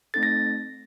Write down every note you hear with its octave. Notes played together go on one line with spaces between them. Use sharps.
A3 C4 D#4 A4 A6
A#6